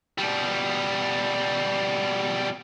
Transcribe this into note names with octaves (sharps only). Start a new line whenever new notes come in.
B2 G3